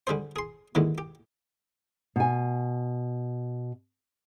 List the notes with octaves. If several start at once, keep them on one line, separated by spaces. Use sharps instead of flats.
D3 G3 G#4 C5
G#4 C6
D#2 G#2 D3 E3
G4
B2 G#5